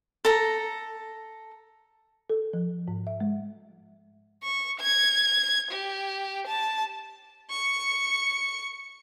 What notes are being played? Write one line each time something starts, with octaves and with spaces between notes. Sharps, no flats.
A4 A#5
A4
F3
G#2
E5
G#3
C#6
G#6
G4
A5
C#6 C#7